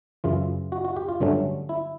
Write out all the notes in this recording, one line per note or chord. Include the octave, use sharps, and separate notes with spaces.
F#2 C#3 E3 F4
F#4
F#4
G4
F4
G2 D3 F#3 A3 C#4
E4